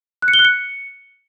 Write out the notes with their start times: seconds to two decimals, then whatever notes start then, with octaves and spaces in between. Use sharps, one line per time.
0.22 F#6
0.28 C#7
0.34 G7
0.39 F#6
0.45 C#7